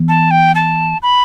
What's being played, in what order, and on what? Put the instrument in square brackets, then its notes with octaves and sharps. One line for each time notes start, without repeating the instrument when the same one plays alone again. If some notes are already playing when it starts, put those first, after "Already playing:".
Already playing: [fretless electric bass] E3 B3
[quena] A5
G5
A5
B5